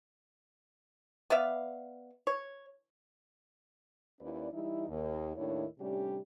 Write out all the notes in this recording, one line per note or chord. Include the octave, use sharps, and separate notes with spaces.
B3 D5 E5 F5
C#5
D#2 C#4 E4 B4 D5
E3 G3 D#4 E4
D#2
D#2 A2 D#3 D4 E4 C#5
A2 C3 G3 C#4 D4 G4